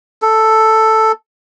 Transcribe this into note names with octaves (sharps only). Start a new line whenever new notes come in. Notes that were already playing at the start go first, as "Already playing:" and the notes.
A4